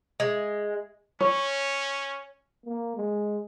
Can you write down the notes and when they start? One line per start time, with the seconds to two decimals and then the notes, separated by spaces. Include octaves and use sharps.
0.20 G#3
1.21 C#4 C#5
2.66 A#3
2.96 G#3